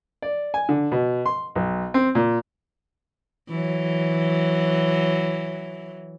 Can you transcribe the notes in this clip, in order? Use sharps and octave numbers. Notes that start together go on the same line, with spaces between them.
D5
G#5
D3
B2
C6
B1
C4
A#2
E3 F#3